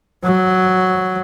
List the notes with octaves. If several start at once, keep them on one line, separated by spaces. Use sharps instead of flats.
F#3